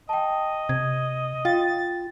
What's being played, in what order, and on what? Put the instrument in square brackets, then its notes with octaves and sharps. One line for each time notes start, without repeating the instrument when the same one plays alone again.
[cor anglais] D#5 [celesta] G5 A5
[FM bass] C3 [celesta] G#6
[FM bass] F4 [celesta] F5 G5 [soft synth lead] A6